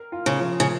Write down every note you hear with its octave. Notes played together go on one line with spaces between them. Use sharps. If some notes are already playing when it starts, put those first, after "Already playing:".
Already playing: A#4
F4
C#3
F3
C#3